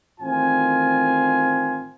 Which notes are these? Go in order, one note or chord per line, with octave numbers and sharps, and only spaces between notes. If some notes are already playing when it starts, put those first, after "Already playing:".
A1 D#3 C4 F4 G#5